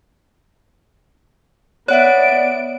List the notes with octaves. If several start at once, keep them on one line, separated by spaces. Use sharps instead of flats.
B3 C#5 D5 E5 F#5 F#6 D7